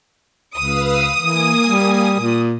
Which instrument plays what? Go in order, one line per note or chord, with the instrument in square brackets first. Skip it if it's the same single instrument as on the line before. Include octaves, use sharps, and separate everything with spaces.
[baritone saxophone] C#2 [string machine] B4 F5 E6 [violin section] D#6
[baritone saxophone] E3 [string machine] A#3 G#5
[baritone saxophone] G3
A#2